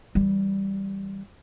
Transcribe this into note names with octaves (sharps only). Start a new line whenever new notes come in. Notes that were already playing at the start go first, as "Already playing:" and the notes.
E3 G3